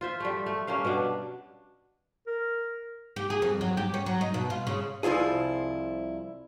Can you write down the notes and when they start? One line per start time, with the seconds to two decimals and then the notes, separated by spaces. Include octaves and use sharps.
0.01 F4 C5 E5
0.20 G3 A3
0.46 A3
0.67 G3 A#3 C#4 F5
0.85 B2 B3 D4
2.27 A#4
3.16 G4
3.30 G#4
3.42 F2
3.61 F#3
3.77 G4
3.94 C#4
4.06 F#3
4.21 D#4
4.34 B2
4.50 F4
4.67 C#3
5.03 C2 F3 E4 F4 G#4